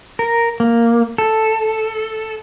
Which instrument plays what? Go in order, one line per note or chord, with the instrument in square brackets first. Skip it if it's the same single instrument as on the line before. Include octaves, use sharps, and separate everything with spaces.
[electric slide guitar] A#4
A#3
A4